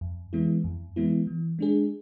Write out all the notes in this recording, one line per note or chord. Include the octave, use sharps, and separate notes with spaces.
F2
E3 G#3 B3 E4
F2
E3 G#3 B3 E4
E3
G#3 D4 G#4